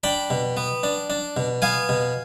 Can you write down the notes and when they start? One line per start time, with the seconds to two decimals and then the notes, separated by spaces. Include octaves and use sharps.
0.03 D4 G5 B5
0.30 B2
0.57 B3
0.83 D4
1.10 D4
1.37 B2
1.62 B3 F5 G#5
1.89 B2